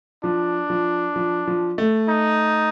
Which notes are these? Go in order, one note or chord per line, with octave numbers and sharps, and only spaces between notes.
F3 D4
F3
F3
F3
A3
D#4